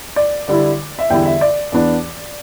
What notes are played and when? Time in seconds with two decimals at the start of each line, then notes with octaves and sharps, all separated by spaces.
0.16 D5
0.48 D3 G3 E4
0.99 E5
1.10 E2 D3 G3 E4 G5
1.25 E5
1.41 D5
1.72 E2 E3 B3 D4